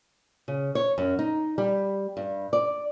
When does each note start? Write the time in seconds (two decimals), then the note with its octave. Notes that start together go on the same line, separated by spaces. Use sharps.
0.48 C#3
0.75 C#5
0.98 F#2
1.19 D#4
1.58 G3
2.17 G2
2.53 D5